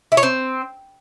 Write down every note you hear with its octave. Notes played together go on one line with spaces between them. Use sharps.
E4
C#5
C4